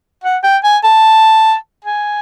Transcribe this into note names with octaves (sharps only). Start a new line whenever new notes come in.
F#5
G5
G#5
A5
G#5